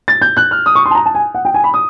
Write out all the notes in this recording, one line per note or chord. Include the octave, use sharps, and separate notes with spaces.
A6
G6
F#6
F6
D#6
C#6
C6
A5
A#5
A5
G#5
F#5
G5
G#5
B5
D#6